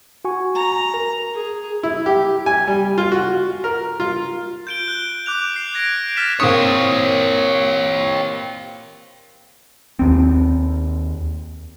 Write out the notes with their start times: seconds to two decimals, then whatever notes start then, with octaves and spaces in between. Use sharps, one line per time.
0.25 F#4 G#5 C#6
0.55 A#5
0.94 A#4
1.34 G#4
1.83 E4
2.06 G4
2.46 G#5
2.68 G3
2.98 F4
3.12 F#4
3.64 A#4
4.00 F4
4.67 G6 D7 G7
4.88 F#6
5.26 D6 F#6 F7
5.56 C7
5.74 G#6 A#6 D7
6.17 F6 A6 B6 E7
6.40 A#2 C4 G4 C#5 D#6
9.99 D#2 C4